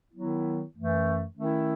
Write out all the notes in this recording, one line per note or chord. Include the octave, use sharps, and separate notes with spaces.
D#3 F#3 B3 E4
F#2 E3 A3
D#3 A3 C#4 E4